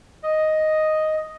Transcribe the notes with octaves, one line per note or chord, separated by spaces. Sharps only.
D#5